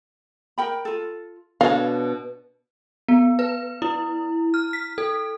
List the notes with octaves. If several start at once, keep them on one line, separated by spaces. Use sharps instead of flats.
A#4 G5 B5
F4 A4
B2 D4 A4 C#5 D#5 F5
B3
B4
E4
F6
B6
A4